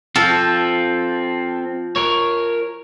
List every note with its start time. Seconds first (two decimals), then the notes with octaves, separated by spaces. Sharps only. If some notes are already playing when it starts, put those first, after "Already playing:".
0.16 F3 C4 A4
1.96 A#4 C#5